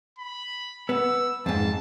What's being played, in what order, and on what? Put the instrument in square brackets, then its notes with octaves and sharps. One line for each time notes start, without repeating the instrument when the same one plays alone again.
[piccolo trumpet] B5
[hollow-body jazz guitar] B3 [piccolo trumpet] E6
[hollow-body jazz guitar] F2 G#2 [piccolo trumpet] A5